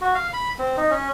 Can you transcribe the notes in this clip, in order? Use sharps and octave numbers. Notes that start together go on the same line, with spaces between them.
F#4
F5
B5
C4
D#4
C#4